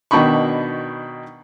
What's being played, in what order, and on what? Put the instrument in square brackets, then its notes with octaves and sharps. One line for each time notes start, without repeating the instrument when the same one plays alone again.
[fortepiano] B2 D#3 D4 B5 C#6